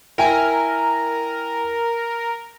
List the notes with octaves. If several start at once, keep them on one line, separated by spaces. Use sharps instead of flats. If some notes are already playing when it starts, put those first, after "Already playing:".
E4 A#4 G5 G#5